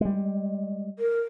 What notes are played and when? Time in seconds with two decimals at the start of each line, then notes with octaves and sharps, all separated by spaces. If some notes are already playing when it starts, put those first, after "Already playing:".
0.01 G3 G#3
0.99 A#4